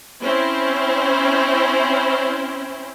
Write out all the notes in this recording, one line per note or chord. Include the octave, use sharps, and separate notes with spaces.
C4 C#4 E4 C5